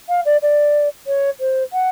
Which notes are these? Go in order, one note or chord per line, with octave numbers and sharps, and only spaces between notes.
F5
D5
D5
C#5
C5
F#5